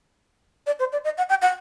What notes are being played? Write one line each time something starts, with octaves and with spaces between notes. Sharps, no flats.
D5
C5
D5
D#5
F#5
G5
F#5